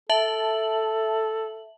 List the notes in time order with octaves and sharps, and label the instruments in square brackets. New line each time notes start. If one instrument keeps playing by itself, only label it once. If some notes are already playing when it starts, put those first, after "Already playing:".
[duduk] A4 [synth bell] E5 A5 F#7